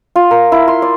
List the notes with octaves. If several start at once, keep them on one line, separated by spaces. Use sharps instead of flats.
F4
A#4
E4
C6
D5